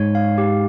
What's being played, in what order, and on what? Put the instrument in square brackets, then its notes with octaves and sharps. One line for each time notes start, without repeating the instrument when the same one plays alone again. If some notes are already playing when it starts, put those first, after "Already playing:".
Already playing: [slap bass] G#2 [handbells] C#5
[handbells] F5
G4